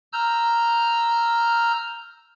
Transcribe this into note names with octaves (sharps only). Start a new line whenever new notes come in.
A#5 E6 F6 G6